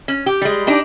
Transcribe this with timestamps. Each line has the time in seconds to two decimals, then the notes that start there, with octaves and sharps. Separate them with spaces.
0.08 C#4
0.26 G4
0.42 G3 G#3
0.67 D4 D#4 G4